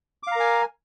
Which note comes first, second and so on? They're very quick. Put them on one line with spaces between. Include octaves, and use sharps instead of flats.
D6 F5 A#5 A#4 G#5